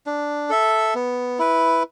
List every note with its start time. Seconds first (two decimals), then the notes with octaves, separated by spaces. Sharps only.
0.06 D4
0.50 A4 E5
0.95 B3
1.39 E4 B4